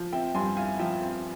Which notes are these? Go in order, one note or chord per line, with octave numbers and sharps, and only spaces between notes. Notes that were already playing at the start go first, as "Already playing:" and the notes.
Already playing: F3
C4 E5 G5
G2 G#5 C6
E4 F5 G#5
F3 E5 G5
C4